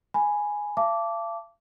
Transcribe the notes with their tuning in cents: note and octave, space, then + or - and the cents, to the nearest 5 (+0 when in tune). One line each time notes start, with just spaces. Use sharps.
G#5 +0 B5 +0
F5 -45 A5 +0 D6 -15